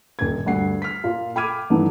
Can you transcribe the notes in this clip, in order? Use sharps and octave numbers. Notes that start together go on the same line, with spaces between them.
D#1 G#6
D2 G2 F#5 C7
F6 B6
A#2 A#3 F4
G5 B5 D6 F6 G#6 D#7
G2 D#3 E3 A3 B3 D4